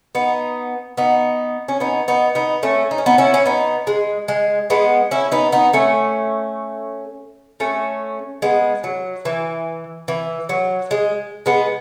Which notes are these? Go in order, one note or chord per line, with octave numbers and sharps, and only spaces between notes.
B3 D#4
B3 D#4
C#4
B3 D#4
B3 D#4
B3 D#4
A3 C#4
D#4
C#4
B3 D#4
C#4 E4
C#4
B3 D#4
G#3
G#3
G#3 B3
C#4 E4
B3 D#4
B3 D#4
A3 C#4
A3 C#4
G#3 B3
F#3
E3
E3
F#3
G#3
G#3 B3